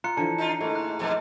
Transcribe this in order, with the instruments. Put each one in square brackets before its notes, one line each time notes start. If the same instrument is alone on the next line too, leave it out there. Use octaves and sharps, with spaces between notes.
[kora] F4 [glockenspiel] A#5 F#6 C#7
[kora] D3 E3 F3 [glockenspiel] A5 C#7
[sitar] D#4 F4
[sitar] G#2 [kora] A3 A#3 E4
[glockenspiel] F#6
[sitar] F2 G#2 B2